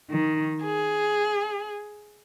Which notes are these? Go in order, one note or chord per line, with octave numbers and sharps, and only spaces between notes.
D#3
G#4